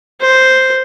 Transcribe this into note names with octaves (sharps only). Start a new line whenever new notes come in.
C5